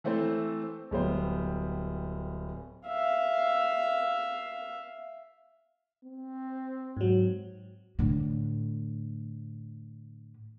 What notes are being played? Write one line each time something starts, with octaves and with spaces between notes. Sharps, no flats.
E3 A3 C4 A4 C5
D1 G3 B3 C5
E5 F5
C4
G#2 F#3
A2 D3